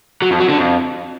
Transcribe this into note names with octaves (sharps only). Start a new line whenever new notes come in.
F#3
F2
F#3
D3
F2